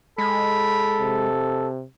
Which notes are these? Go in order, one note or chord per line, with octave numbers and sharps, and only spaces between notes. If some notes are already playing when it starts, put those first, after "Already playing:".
G#3 A4 B5
C3